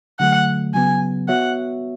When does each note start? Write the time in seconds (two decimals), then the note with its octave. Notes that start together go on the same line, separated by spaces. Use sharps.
0.20 D3 F#3 A3 F#5
0.74 C#3 F#3 B3 G#5
1.29 B3 F#4 C#5 E5 F#5